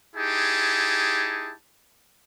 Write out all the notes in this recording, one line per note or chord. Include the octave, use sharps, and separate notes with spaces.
D#4 E4 G4 G#4 A5